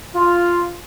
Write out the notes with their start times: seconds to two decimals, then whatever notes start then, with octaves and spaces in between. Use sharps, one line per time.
0.15 F4